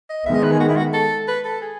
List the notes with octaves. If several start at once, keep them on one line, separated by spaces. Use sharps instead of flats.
D#5
D#3 G#3 B3 E5
D#5
B4
G#4
F#4
E4
F#4
A4
B4
A4
G#4